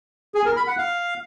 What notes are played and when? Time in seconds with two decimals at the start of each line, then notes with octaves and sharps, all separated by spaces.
0.35 G#4
0.45 A#4
0.56 B5
0.67 F#5
0.78 F5